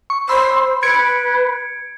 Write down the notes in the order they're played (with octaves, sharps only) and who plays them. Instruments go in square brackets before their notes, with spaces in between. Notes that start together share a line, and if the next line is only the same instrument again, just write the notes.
[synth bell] C#6
[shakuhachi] C5 [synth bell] B5 C6 E6
[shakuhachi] B4 [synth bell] G#6 C#7 D7